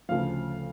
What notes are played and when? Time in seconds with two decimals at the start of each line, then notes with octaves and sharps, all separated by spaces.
0.09 D2 C#3 F3 F5